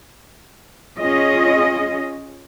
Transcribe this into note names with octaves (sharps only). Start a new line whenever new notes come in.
C#4 F4 G#4 D#5